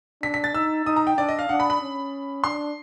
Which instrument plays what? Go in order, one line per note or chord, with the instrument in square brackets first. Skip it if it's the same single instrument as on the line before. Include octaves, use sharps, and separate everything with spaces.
[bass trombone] D4 [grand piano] B6
[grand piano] B6
A6
[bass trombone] D#4 [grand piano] E6
[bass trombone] D#4 [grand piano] D#6
[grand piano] A#5
G5
[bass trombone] D4 [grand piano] D5
[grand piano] D#5
F5
[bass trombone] D4 [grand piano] F#5
[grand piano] B5
B5
[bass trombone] C#4
[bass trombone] D4 [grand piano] C6